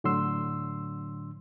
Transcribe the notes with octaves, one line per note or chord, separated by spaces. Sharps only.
A2 D3 F#3 D4 C6 E6